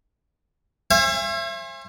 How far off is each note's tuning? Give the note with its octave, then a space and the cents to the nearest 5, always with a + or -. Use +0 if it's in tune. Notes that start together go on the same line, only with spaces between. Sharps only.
C5 +40 E5 +35 G#5 -35